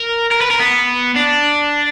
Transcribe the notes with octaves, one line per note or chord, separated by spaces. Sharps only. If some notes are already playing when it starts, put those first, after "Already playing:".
Already playing: A#4
A#4
B4
A#4
B3
D4